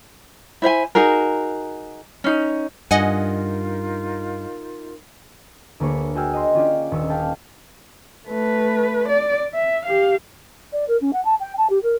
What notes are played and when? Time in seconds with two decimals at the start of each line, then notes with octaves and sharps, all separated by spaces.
0.62 E4 C5 E5 G#5
0.95 D#4 F#4 G#4 A#4
2.24 C#4 D#4
2.91 G2 D#4 F4 A#4 D#5 F#5 G#5
5.80 D2 A#3 G#4 B4 C#5
6.15 F#4 G#4 G5 G#5 E6 F6
6.33 D#5 A#5 C6
6.55 C#4 D4 F4 G4 G#4 D5
6.91 D#1 C#6 E6
7.09 G4 G#4 F5 G5 A5 F6
8.28 A3 B4
9.09 D5
9.54 E5
9.85 G4 F5
10.73 D5
10.88 A#4
11.01 C#4
11.13 F#5
11.25 A5
11.40 G5
11.58 A5
11.70 G4
11.83 A#4